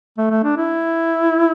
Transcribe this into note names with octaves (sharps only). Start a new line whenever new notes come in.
A3
A3
D4
E4